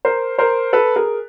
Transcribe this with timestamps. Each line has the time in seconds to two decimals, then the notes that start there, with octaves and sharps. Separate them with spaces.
0.05 A#4 C5
0.39 A#4 C5
0.73 A4 B4
0.96 G#4 A#4